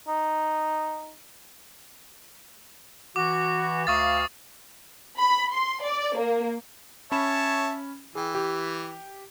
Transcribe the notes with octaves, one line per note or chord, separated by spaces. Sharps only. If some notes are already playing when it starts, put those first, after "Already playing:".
D#4
E3 F#4 D6
D2 F5 C#6 D#6 A6
B5
C6
D5
A#3
C#4 C#5 E5 A5 B5 E7
E3 G#4 G5
G4